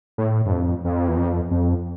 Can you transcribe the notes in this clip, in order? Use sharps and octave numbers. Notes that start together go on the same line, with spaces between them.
A2
G2
F2
F2
E2
F2
F2